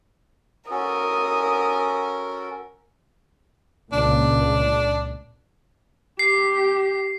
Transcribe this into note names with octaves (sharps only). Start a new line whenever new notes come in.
C#4 F#4 A4 A#4 D#6
C#2 A#2 D4
G4 C7